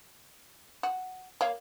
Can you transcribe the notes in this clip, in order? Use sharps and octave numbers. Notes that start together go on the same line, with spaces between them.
F#4
A#3 C#5 F5